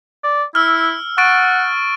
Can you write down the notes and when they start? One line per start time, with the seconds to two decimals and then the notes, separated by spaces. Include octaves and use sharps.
0.24 D5
0.55 E4 E6 F6
1.18 F#5 C#6 A6 D7